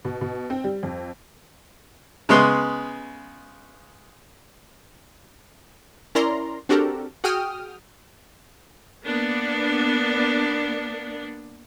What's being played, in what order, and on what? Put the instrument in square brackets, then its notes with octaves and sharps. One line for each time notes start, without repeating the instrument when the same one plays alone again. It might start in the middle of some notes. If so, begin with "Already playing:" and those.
[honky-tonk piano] B2
B2
C4
G3
F2
[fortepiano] C#3 G#3 B3 C6
[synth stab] C#4 E4 A#4 D5 A#5 C6
C4 D4 F#4 G4 A4 A#4
F#4 G#4 G5 D#6 F6
[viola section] A#3 B3 D4